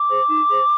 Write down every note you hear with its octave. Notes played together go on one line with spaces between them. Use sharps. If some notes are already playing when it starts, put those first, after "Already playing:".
Already playing: D6
G#4 C5
D#4
G#4 C5